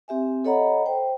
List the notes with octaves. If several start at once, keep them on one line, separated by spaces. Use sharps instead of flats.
C4 G4 E5 G#5
A4 C#5 D#5 F#5 A#5 B5
C5 G5